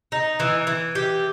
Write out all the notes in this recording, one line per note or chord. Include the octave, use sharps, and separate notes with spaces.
D#4
E3
E3
G4